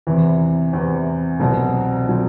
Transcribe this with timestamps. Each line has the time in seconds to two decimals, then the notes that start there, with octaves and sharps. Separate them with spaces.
0.07 E2 C3 E3
0.73 E2 C3 E3
1.40 C2 B2 F#3 C4
2.07 B2 F#3 C4